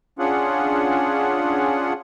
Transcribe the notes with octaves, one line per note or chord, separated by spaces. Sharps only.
C#4 D4 F4 G#4 F#5